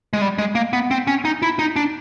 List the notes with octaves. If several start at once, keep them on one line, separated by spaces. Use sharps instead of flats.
G#3
G3
G#3
A#3
B3
C4
C#4
D#4
E4
D#4
D4